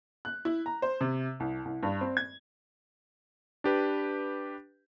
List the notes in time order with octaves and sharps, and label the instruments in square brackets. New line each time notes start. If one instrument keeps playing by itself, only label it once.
[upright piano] F#6
E4
A#5
C5
C3
C2
C2
G2
C4
G#6
[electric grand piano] D4 G4 B4